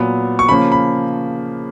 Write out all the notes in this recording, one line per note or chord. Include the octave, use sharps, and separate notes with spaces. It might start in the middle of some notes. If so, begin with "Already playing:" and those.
Already playing: A#2 F#3 B3
C#6
C#3 F3 A#3 C#4 B5
B5